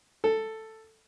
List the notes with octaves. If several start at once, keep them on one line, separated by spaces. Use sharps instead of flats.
A4